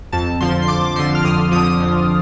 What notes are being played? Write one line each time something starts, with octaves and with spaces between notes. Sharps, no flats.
F2 A5
D3 F3 C6
C6
F2 D6
D6
D3 F3 C6
F6
F2 D#6
D3 F3 D#6
F2